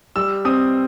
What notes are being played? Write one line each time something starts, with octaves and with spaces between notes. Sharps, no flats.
G3 E6
C4 D#6